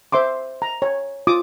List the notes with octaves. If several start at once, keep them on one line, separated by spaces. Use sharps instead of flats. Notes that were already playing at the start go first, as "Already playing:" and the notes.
C5 E5 C6 D6
A#5
C#5
F4 D6 D#6